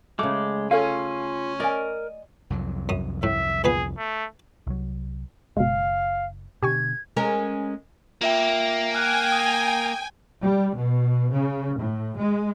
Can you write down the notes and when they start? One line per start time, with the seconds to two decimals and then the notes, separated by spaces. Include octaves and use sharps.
0.19 C#3 G#3 A3 D6
0.71 C#4 F4 A4 C#5 F5 G#5
1.60 A#4 D5 D#5 G#5
2.50 C2 F2 F#3
2.89 F#2 D#6
3.23 A2 E5
3.64 A#2 B3 G#4 B4
3.98 A3
4.67 C2 F#3
5.57 F#1 B2 G#3 F5
6.63 B2 D3 G4 G#5 C#6 G#6
7.17 G#3 C#4 A#4
8.21 A#3 F4 E5 G5
8.95 G5 G#5 F6 F#6
9.32 D#6
10.42 G3
10.73 B2
11.32 C#3
11.78 A2
12.16 G#3